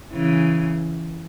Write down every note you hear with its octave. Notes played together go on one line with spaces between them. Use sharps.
C#3 E3